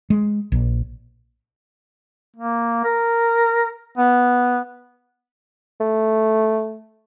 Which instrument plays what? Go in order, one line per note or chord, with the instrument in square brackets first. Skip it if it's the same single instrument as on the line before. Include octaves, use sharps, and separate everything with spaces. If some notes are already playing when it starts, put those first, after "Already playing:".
[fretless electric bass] G#3
A#1
[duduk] A#3
A#4
B3
[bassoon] A3